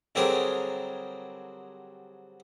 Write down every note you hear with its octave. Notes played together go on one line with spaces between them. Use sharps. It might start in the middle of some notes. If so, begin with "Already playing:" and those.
D3 F#3 G3 C4 G#4 A#4